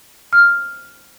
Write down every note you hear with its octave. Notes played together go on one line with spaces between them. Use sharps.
F6